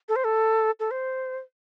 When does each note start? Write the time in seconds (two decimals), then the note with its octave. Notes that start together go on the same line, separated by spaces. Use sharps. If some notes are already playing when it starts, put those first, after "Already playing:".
0.09 A4
0.16 C5
0.24 A4
0.80 A4
0.91 C5